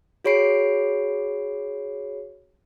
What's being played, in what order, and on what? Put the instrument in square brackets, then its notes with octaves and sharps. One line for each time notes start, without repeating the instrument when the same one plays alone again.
[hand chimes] F#4 G#4 C#5 B5 C7 D7